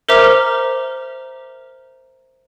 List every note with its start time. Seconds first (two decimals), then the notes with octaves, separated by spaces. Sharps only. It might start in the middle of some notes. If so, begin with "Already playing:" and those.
0.09 A#4 C5 E5 A#5 D6 F6